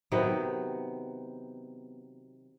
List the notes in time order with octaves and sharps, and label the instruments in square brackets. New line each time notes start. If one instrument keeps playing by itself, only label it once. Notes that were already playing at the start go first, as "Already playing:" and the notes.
[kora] C3 D#3 F#3 B3